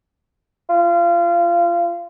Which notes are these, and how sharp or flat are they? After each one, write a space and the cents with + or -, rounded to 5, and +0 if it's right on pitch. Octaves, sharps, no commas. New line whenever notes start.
F4 -25